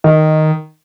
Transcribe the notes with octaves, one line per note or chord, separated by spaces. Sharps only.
D#3